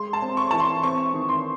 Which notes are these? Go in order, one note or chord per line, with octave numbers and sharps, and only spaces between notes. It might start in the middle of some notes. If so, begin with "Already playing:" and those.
Already playing: G#3 C6
A5
C4
C#6
E3 A5
C6
C4 C#6
D#3
C6